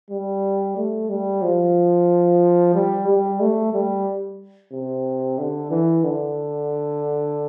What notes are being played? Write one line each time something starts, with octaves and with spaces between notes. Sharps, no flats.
G3
A3
G3
F3
G3
G3
A3
G3
C3
D3
E3
D3